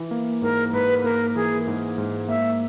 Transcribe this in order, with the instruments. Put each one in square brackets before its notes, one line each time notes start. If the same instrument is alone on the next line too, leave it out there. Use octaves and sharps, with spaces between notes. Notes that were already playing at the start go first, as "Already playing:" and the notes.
Already playing: [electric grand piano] E3
A#3
[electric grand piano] G#2 [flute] A#4
[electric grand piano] G#2 [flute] B4
[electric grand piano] A#3 [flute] A#4
[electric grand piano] E3 [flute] G#4
[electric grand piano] G#2
G#2
[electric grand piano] A#3 [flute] E5